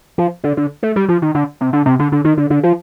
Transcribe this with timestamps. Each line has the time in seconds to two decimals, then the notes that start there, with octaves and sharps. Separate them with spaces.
0.18 F3
0.44 D3
0.57 D3
0.83 A3
0.96 G3
1.08 F3
1.22 D#3
1.35 D3
1.61 C3
1.73 D3
1.86 C3
1.99 D3
2.12 D3
2.24 D#3
2.37 D3
2.50 D3
2.63 F3